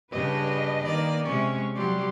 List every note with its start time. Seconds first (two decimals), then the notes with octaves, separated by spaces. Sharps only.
0.11 G2 C#3 D4 B4 D#5
0.84 D#3 A#3 D5
1.25 C3 G#3 C#4 C#6
1.76 F#3 G3 D5 C6